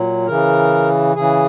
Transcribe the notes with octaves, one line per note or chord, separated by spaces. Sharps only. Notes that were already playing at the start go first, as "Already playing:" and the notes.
Already playing: A#2 F#3
C#3 E3 A#4
C#3 E3 G#4